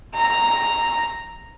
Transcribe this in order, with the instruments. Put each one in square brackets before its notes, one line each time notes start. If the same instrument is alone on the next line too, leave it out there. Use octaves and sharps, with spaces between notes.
[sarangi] A#5